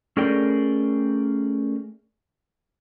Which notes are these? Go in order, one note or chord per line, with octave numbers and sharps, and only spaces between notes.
A3 C#4 G#4 A#4 D5 G5